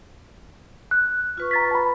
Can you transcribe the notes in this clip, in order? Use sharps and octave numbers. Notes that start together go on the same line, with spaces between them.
F#6
F4 B4 C#6
A#5 A6 B6
A5 B5